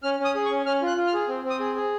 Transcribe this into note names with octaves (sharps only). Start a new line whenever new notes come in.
C#4 F6
C#4
D#6
G#4
C#6
C#4
C#4 F6
F4 F#6
F4
F6
G#4
C4
C4
D#6
G#4
G#4